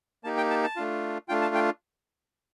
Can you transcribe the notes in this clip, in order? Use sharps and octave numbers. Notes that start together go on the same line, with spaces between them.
A#3 D#4 G4 A5
G5
A5
A5
A3 D4 F4
A3 D4 F4 G5
A5
G5